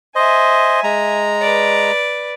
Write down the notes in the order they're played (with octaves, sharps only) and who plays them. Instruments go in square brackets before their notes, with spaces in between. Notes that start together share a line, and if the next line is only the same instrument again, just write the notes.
[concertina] C5 D#5 [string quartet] E5 G#5
[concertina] G#3 A#5
[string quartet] B4 D5